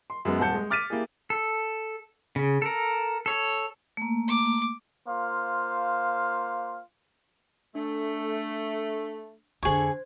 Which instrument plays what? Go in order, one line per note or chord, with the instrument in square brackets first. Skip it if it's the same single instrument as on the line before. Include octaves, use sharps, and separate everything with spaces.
[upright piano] C6
F#2 G#3 B3
D#1 C4 F#5 A5 G6 C#7
G#3
D6 F6 A6 B6 D#7
A#3 E4 G4 G#4
[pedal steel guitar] A4
C#3
A4 A#4
A4 C#5
[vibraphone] A3 A#3
[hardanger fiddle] D6
[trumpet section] A#3 F4 C5 F5
[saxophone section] A3 [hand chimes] D4
[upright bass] F2 D3 [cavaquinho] G#4 C#6 [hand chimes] C5 G#6